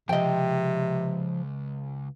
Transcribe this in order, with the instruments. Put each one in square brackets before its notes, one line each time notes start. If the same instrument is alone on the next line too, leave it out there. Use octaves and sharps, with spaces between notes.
[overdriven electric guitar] C#2 F#2 [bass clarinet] C3 [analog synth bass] F3 [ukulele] D#5 G5